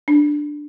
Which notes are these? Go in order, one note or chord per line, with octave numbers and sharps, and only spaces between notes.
D4